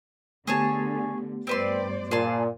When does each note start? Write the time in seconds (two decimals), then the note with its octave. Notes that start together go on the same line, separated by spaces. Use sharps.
0.47 D3 A3 B3 G4 G#4 C#5 A5
1.47 G2 C4 B4 C5 D5 C6
2.11 A#2 G#4 A5 C6